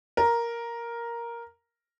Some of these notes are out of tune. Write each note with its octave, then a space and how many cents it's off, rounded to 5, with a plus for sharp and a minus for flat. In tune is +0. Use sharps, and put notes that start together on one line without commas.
A#4 +5